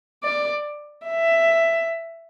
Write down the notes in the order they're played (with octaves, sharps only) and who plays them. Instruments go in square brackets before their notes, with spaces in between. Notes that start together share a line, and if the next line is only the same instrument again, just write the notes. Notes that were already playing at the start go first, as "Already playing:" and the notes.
[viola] D5
E5